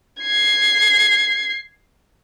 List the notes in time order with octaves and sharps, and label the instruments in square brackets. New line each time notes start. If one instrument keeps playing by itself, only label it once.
[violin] G#6 C7